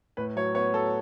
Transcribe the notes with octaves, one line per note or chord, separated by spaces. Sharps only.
A2 B4
F#3 C#5
B3 C#5
F#3 A4